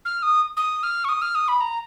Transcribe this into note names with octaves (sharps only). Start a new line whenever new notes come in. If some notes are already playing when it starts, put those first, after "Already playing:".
F6
D#6
D#6
F6
C#6
D#6
F6
D#6
B5
A#5